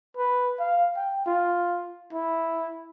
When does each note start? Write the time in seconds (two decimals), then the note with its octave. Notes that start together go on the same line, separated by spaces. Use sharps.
0.17 B4
0.59 F5
0.96 G5
1.26 F4
2.13 E4